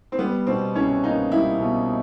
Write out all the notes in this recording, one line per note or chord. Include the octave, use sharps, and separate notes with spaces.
C4
G3 B3
B2 C4
C2 C#4
A#3 D#4
G3 E4
B2